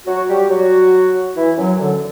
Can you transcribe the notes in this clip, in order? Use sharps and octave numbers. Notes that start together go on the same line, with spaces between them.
F#3 F#4
G3 G4
F#3 F#4
E3 E4
F#2 F#3
D3